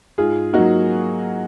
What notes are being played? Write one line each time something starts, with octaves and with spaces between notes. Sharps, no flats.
G#2 F4 G#4
F#3 A#3 D#4 F#4